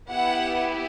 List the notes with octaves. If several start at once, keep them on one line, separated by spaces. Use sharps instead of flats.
B3 E4 G4 F#5